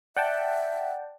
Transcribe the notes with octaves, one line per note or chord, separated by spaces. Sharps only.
D5 E5 F#5 G5 A5